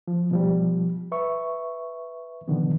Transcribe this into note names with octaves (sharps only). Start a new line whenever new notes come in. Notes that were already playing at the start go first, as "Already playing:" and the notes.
F3
B2 F3 G3
B4 E5 C#6
B2 D3 D#3 F3 B3